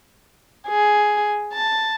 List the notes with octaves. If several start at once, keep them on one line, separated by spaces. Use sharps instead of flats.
G#4
A5